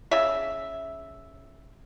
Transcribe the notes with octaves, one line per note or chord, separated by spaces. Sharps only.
C#3 E5